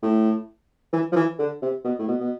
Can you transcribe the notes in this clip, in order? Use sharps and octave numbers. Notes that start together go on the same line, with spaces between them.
A2
E3
F3
E3
D3
C3
B2
A2
B2
B2